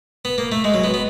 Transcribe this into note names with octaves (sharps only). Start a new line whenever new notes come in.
B3
A#3
A3
G#3
F#3
B3
B3